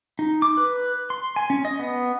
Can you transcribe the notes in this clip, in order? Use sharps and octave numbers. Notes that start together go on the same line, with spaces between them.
D#4
D6
B4
C6
G#5
C#4
D#5
B3